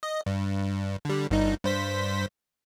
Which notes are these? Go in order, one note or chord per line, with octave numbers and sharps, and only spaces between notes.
D#5
G2
D3 G3
G1 G2 D#4
G2 C5 B6